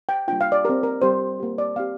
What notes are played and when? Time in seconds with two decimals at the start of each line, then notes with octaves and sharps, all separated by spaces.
0.09 G5
0.28 G3 A#3 D4 F4 G5
0.41 F5
0.52 D5
0.64 G4 A#4
0.69 C4
0.83 A#4
1.01 G3 C4 G4 C5
1.40 A#3 G4
1.58 D5
1.76 C4 G4 F5